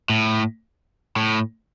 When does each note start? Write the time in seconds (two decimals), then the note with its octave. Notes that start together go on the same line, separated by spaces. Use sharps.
0.09 A2
1.16 A2